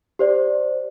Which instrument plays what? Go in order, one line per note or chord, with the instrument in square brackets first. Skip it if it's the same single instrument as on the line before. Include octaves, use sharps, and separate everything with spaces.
[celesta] G4 C5 D5